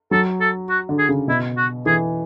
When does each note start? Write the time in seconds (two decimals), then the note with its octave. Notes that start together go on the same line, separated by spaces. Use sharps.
0.11 F#3 A4
0.41 A4
0.69 F#4
0.89 D3
0.98 G#4
1.09 C#3
1.28 B2 E4
1.57 F#4
1.86 E3 G#4